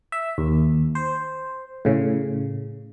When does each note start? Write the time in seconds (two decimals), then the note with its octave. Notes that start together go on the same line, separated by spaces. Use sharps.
0.12 E5
0.38 D#2
0.95 C5
1.85 A2 C#3